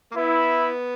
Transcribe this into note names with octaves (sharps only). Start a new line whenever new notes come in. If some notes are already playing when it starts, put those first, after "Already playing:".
A#3
B3 E4